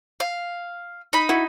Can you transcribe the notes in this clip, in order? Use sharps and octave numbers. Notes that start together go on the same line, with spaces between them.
F5
D#4 B5
E4 F#4